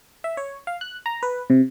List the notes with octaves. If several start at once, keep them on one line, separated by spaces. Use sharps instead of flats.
E5
C#5
F5
F#6
A#5
B4
C3